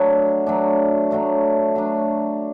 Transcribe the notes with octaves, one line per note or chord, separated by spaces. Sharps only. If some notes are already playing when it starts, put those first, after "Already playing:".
Already playing: F#3 A3 D4
F#3 A3 D4
F#3 A3 D4
F#3 A3 D4